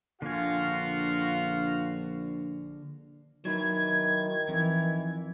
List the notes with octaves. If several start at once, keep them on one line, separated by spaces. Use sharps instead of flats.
A#1 D3 F4 F#4 F5 G#5
D#3 F#3 D#4 E4 G#6
F2 E3